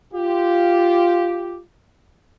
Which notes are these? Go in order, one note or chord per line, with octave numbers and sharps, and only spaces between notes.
F4 G4